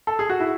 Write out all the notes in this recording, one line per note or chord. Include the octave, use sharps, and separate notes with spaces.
A4
G#4
F#4
E4